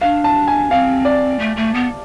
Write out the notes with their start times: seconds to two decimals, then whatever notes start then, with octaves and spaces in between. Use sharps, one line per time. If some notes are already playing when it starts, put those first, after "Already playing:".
0.01 D4 F5
0.24 A5
0.48 G#5
0.71 C4 F5
1.05 D5
1.39 A3
1.56 A3
1.74 B3